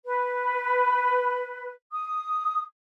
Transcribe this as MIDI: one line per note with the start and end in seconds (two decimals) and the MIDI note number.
0.05 1.70 71
1.92 2.61 87